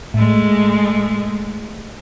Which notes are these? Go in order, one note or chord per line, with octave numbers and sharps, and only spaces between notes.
A2 G#3 A3